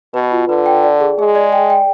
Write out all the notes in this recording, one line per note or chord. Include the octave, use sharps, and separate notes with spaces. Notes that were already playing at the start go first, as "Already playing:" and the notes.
B2 B4
F4
D3 B4
G5
D5
G#4
G#3 G#4
D5
G5
G5